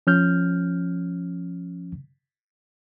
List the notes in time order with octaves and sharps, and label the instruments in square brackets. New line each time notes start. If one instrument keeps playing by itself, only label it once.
[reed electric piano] F3 C#4 F6 G6